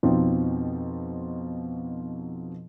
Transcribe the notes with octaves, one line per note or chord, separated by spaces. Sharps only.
F2 B2 F3 C4 D#4